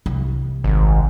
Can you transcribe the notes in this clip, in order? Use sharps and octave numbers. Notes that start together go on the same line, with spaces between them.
C2
G#1